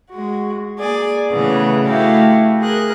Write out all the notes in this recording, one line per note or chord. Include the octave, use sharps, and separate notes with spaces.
G#3 F#4
A#3 G#4 D5 G#5
C#3 E3 A3 B3 C#4 G#4
A3 E4 F#4 G4 F5
G#4 A#4 F#6